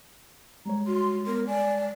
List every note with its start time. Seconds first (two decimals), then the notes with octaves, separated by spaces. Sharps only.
0.66 G3 G#3 C#5 A#5
0.87 F#4 C6
1.26 B3 A#4
1.47 D5 G#5